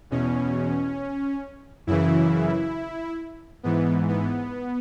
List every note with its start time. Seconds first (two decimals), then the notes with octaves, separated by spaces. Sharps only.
0.11 E2 B2 C#4
1.87 F#2 C#3 E3 E4
3.63 G#2 E3 B3
4.08 B3